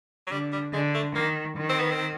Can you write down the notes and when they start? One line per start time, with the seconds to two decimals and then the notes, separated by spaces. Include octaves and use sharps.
0.27 F#3
0.31 D3 G3
0.52 G3
0.73 D3 G#3
0.95 A3
1.15 D#3 A#3
1.57 D#3
1.69 C4
1.80 B3
1.91 C4